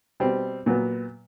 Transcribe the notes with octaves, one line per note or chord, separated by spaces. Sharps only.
B2 G3 C4
A#2 F#3 B3